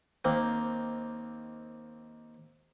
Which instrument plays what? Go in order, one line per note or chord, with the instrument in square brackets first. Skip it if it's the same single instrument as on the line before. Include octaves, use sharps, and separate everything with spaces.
[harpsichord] D#2 A#3 C4